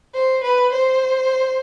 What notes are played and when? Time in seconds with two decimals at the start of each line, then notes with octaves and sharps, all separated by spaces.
0.14 C5
0.44 B4
0.72 C5